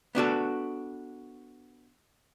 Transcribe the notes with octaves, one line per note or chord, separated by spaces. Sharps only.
B3 D4 F#4 A4